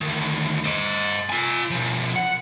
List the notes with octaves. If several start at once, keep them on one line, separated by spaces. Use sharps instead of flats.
D2 D#3
C5 D#5
F4 G#5
B2 F3
F#5